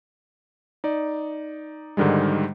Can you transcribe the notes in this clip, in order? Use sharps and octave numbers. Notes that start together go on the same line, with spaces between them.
D#4 D5
G#2 D3 D#3 G3 G#3